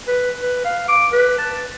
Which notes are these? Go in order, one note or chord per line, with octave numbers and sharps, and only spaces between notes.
B4
B4
F5
D6
B4
A5